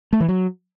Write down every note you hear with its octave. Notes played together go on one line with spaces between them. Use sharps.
A3
E3
F#3